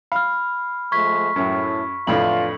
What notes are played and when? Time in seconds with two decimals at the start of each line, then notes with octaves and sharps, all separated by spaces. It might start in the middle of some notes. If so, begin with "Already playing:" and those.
0.12 F5 B5 F6
0.92 F3 G#3 A3 C#6 G#6 B6
1.36 F#2 A2
2.07 F2 A2 D3 E3 D4 F4 F#7